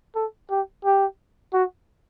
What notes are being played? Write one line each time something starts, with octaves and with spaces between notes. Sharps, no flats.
A4
G4
G4
F#4